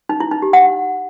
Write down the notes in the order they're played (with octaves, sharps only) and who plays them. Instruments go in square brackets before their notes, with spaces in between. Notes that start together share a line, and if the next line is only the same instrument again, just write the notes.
[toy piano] D#4
E4
D#4
G4
F#5